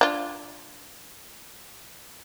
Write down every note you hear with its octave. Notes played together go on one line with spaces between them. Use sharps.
D4 F4